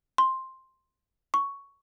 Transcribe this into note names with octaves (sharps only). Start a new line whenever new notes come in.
C6
C#6